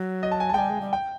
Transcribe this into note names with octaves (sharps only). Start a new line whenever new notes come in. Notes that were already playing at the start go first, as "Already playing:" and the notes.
Already playing: F#3
D#5
A5
G#5
G#3 G5 A5
G3 G#5
G#3
G3
G5